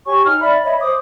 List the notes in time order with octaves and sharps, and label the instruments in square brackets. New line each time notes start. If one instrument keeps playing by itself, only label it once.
[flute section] G4 C#5 G#5 C#6
D#4 F6
D5 E5 B5
C#5 D#5 E5 B5
C5 D6 D#6